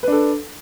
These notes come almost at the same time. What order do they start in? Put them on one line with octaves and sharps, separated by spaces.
B4 D4 A4